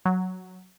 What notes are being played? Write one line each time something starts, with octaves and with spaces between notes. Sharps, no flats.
F#3